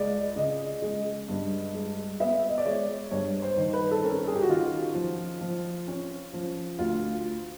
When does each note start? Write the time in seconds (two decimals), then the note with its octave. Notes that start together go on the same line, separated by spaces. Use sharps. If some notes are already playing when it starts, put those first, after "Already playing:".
Already playing: C#2 G#3 D5
0.36 C#3 D#5
0.82 G#3
1.28 G2
1.74 G#3
2.20 B3 E5
2.49 D#5
2.58 D5
2.65 G#3 C#5
3.11 G2 C#5
3.42 C5
3.57 D#3
3.73 B4
3.91 A4
4.04 C#4 A#4
4.27 G#4
4.35 G4
4.42 F#4
4.49 D#3 F4
4.95 F3
5.41 F3
5.88 C#4
6.33 F3
6.79 D2 F4